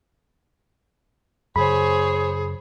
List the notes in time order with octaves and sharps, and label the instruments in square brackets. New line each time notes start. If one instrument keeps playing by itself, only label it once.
[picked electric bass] F#2 C#3 [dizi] G#4 [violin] C5 C#5 [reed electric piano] B5